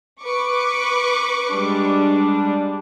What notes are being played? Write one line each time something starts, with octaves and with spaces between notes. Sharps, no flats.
B4 C#6 D6
G3 G#3 D4